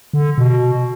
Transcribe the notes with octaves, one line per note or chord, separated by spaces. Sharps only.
D3
B2